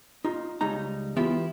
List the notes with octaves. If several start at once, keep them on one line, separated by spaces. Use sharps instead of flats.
D#4 F4
C#2 G3 G#3 D#4 A#5
E3 B3 E4 F4 G4